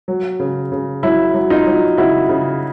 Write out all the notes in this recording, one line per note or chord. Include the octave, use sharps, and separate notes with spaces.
F#3
C#3
C#3
F#3 E4
F#3
D#4 F4
F#3
C#3 E4 F#4
C#3